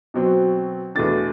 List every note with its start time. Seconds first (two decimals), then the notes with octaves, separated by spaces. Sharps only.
0.14 B2 F#3 C4
0.95 E2 B2 A3 D4 A6